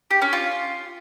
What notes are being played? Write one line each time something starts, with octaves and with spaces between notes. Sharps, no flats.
G4
C#4
F4